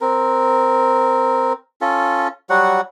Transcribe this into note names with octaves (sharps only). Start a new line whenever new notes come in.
C4 A#4
C#4 F4 A4
F#3 G3 F#4 F#5